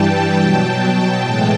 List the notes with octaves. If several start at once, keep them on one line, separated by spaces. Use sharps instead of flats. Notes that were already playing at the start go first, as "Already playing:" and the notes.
Already playing: G2 E3 G3 G5 A5
B2 F#3
A2 E3 G#3 G5 A5